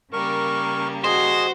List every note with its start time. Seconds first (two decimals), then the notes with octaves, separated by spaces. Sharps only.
0.13 C#3 G3 A#3 A#4 C#6
1.04 F#4 G#4 C5 D#5